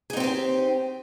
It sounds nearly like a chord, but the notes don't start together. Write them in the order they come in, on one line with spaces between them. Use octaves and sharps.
G#4 D#4 C4 G4 C5